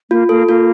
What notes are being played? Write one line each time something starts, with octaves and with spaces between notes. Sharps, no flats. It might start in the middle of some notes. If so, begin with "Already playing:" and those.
A#3 F4
A#3 A4
A#3 F4